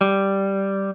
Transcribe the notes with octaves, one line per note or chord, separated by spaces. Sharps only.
G3